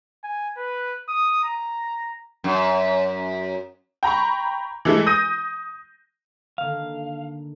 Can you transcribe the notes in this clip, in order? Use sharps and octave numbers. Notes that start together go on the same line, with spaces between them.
G#5
B4
D#6
A#5
F#2
G5 A#5 B5 C#6
E3 G#3 A3 E4
D#6 G6 A#6 D#7
D3 D#3 A#3 F5